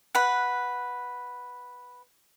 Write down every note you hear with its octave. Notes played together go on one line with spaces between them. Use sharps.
B4 F#5